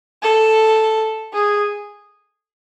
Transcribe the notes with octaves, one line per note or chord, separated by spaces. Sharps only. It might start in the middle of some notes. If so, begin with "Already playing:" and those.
A4
G#4